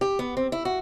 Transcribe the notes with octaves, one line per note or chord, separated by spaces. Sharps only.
G4
B3
C4
E4
F#4